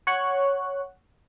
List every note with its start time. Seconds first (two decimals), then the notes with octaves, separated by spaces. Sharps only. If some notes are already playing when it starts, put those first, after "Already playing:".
0.07 C#5 F#5 C#6 F#6